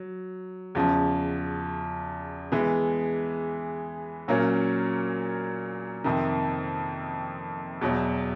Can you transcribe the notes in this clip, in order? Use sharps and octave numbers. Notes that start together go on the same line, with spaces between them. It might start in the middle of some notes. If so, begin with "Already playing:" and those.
Already playing: F#3
E2 C#3 F3
E3 G#3 B3
A#2 F#3 A#3 C#4
F2 C3 D#3
E2 B2 F#3